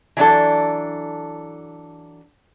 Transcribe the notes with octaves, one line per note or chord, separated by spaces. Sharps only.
E3 F#3 D4 A4